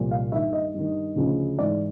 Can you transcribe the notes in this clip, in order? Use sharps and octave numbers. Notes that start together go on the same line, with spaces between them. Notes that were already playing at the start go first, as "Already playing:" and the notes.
Already playing: C2 A#2 F3
F5
G2 D#3 E5
D#5
G2 D#3
D2 C#3 F3
G#2 E3 D5